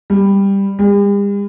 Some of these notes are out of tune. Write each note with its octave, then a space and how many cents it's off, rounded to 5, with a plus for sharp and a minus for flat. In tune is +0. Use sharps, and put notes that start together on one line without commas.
G3 +10
G3 +45